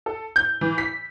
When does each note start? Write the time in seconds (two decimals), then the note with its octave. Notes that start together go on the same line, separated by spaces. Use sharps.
0.06 A4
0.36 G6
0.61 E3
0.78 B6